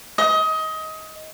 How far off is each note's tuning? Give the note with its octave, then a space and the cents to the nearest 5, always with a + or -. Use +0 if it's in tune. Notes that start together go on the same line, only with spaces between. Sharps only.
D#5 +25